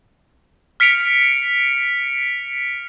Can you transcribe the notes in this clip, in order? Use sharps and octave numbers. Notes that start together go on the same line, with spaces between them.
F6 B6 C#7 D7 F7